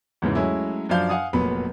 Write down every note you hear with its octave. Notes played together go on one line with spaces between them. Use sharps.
E2 G#2 C#3 E3
F#3 G#3 A3 C#4 E4
F#2 F3 D4 F5 G6
F5 F#5 G#5 D#6
F1 A#2 F#3 B3 B4 B5